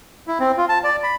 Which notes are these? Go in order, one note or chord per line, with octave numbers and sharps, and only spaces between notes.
E4
C4
F4
A5
D5
B5